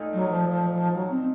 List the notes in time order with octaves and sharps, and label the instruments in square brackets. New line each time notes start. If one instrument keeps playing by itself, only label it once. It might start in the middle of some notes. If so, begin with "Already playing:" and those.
Already playing: [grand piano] A#2 A3 D#4
[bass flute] F#3
F3
F3
F3
F#3
C4